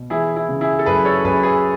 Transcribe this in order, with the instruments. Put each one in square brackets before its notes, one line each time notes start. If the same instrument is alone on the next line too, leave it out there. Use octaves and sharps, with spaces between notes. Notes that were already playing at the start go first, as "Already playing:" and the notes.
Already playing: [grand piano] B2
E3 E4 G#4
E4
C#3
E4 G#4
A4
F#2 G#4 B4
A4 C#5
F#2 G#4 B4
G#4 B4